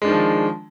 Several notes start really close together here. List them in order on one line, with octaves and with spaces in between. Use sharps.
G#3 D4 D#3 F3